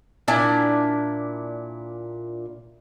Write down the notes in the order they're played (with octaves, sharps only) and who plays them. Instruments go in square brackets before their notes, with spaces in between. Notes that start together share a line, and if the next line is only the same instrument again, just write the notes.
[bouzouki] A#2 D4 E4 G#5